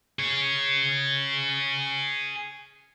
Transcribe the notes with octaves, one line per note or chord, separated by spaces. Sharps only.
G#4 C#5